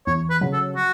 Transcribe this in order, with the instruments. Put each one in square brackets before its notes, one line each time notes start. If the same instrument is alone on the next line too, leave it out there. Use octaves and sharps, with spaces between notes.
[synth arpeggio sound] E2 [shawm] C#5
[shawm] B4
[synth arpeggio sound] C#3 F#3
[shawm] A4
F#4